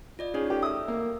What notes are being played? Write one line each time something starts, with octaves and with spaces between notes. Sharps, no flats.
F4 D5 D#5
C#4 D#4 G#4 C#5
G4 A4
E5 D#6 E6
A#3